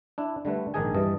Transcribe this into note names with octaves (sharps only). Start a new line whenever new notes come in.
D4 E4
D3 G3 A3 B4
A#1 G#2 D#3 D4 G#4 G#5
G2 E3 G3 D#5 A5